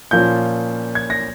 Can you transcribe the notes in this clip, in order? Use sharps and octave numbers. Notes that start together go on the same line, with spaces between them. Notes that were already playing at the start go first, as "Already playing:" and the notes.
A#2 F3 A#3 C#4 F4 G6
G#6
A#6